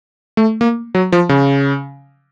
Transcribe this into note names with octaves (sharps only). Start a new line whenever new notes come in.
A3
A#3
F#3
F3
C#3